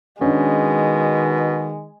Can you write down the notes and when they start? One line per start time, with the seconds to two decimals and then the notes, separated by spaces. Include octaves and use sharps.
0.21 B2 D#3 G#3 C#4 D4